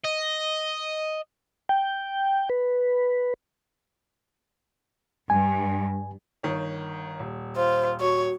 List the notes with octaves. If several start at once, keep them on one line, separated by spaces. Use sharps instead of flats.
D#5
G5
B4
G2 G#5
G1 D#3 C#5
D#1
F4 C5
F#4 C#5